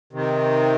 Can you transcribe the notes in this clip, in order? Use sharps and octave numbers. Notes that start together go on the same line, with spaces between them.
C3 D#3